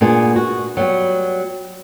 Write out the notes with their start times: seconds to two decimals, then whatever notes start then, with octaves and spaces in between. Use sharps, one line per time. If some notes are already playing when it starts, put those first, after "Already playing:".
0.01 A#2 B3 D4 G#4
0.36 F#4
0.77 F#3 G3 B3